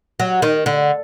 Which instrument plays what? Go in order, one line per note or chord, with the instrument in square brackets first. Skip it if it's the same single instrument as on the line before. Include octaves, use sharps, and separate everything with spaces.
[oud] F#3
D#3
D3